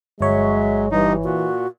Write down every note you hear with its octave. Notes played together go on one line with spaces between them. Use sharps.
G1 F#3 G#3 C#5 E5
G2 E3 G3 D#4
A#2 F#4